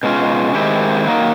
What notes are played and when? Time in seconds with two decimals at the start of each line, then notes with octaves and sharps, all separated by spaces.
0.03 B2 G#3 C#4 F4
0.54 D#3 G#3 C4 E4 G4
1.07 F#3 A#3 D#4